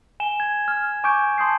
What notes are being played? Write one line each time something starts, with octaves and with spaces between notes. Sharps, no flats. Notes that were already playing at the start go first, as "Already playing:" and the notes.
G#5 E7 G7
G#6
F6
G#5 C#6 D6 G6 D7
A5 C6 D#6 G6 C7